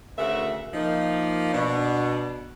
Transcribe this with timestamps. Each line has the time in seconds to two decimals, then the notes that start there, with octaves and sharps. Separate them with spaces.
0.18 D2 C#3 A3 F#4 A#4 E5
0.74 F3 A#3 D#4
1.53 B2 D4